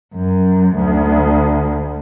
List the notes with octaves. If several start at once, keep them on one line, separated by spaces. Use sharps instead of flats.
F#2
D2